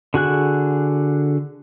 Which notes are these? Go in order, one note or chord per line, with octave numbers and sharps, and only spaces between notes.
D3 F#4 G#4 F#6